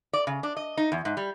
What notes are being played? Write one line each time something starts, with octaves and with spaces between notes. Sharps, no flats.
D5
C#3
D4
D#5
D#4
E2
G#2
G3